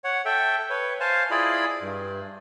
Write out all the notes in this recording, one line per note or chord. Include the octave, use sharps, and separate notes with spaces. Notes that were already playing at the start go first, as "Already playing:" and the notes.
C#5 F#5
A4 E5 G5
B4 C#5
C5 F5 G#5 A5
E4 F4 G#4 D5 D#5 B5
G2